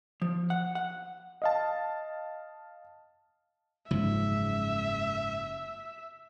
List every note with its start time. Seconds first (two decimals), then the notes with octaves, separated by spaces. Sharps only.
0.22 F3
0.50 F#5
0.75 F#5
1.42 D#5 F5 A5
3.91 F#1 G#2 C#3 F3 E5